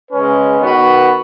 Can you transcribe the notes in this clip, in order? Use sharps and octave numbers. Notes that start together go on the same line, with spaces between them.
C#3 G#3 C#4 B4
D#3 B3 F#4 B4